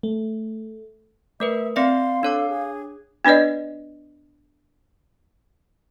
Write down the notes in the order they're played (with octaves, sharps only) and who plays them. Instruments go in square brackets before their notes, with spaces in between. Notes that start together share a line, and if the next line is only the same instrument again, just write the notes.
[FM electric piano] A3
[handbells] A3 A#4 B4 [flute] E5
[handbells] C4 D5 E5 [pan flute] F5 [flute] C6
[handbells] D4 C#5 D6 [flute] A4
[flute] G#4
[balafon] B3 D4 B4 D5 D#5